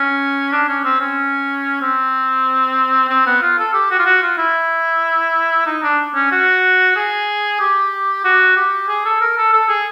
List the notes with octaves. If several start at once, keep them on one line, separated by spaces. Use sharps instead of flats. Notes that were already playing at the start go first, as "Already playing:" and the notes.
Already playing: C#4
D4
C#4
C4
C#4
C4
C4
B3
F4
A4
G4
F#4
F4
F#4
F4
E4
D#4
D4
C#4
F#4
G#4
G4
F#4
G4
G#4
A4
A#4
A4
A4
G#4